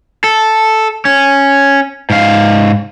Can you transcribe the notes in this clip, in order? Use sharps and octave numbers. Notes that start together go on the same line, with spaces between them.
A4
C#4
G#2 F5